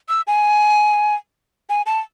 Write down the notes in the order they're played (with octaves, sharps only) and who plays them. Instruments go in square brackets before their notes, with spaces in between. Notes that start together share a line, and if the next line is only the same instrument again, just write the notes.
[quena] E6
G#5
G#5
A5